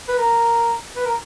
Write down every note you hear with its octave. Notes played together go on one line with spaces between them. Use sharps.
B4
A#4
B4
A#4